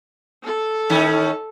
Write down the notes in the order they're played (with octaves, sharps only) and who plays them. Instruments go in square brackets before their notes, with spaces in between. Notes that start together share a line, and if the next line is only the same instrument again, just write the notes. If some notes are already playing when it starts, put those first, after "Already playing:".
[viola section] A4
[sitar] A2 D#3 C#4